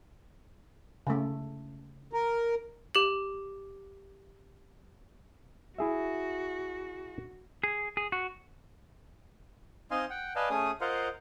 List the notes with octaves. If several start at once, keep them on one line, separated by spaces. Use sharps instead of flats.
C#3 A3
A#4
G4 F#7
E4 F#4 G#4 E5
G#4
G#4
F#4
C4 D#4 D#5 F5 G#5 C6
F#5 G5
B4 D5 D#5 F5 G#5 A5
A3 C#4 G#4 G#5 D#6
F4 A#4 C5 D#5 F5 F#5